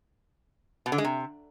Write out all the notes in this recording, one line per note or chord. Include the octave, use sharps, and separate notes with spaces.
B2
D3
G#3
C3